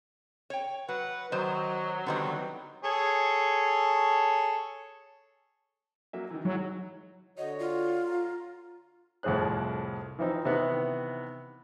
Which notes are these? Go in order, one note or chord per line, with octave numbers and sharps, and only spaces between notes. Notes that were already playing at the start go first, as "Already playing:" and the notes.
C#5 G5
F#3 B4 F#5
F#2 D#3 F#3 C5 D#5
D3 D#3 G3 B3 C4
G#4 A4 C#5
F#3 A#3 E5
D#3 E3
G#2 F#3 E4 E6
D3 F#4 C#5 D#5
F4
A#5
C2 F2 A2 G#4 C5 F#6
E3 F3 C4 D#4
C3 D#3 E3 B3 F#6